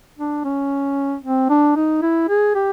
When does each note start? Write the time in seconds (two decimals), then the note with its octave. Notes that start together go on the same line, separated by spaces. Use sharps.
0.19 D4
0.44 C#4
1.23 C4
1.50 D4
1.76 D#4
2.02 E4
2.29 G#4
2.55 G4